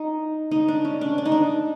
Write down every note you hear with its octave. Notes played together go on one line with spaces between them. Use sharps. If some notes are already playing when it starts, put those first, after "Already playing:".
Already playing: D#4
D#4
D4
C#4
D4
D4
D#4
D4